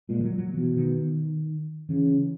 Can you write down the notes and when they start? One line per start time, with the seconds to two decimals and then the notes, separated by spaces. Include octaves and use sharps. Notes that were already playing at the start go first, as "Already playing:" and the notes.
0.08 A#2 G#3
0.20 E3
0.24 F#3
0.38 F#3
0.54 B2 E3
0.77 D#3
1.89 C#3 E3